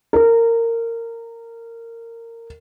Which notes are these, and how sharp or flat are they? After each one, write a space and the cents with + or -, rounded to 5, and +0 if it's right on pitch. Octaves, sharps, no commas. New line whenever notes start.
A#4 -20